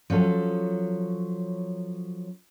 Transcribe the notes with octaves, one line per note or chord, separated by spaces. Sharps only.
F3 F#3 C#4 A4